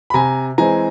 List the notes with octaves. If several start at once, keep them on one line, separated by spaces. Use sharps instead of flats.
B5
C3 G#5 A#5
E3 G#3 C4 G#5 A#5